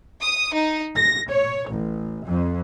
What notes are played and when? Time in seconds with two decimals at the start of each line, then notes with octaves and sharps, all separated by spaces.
0.22 D#6
0.54 D#4
0.96 A#6
1.30 C#5
1.69 A1
2.25 F2